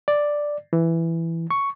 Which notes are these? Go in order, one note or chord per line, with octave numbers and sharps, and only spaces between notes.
D5
E3
C#6